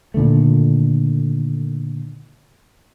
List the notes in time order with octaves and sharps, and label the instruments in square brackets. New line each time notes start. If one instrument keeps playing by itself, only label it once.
[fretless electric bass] A#2 D3 D#3 A3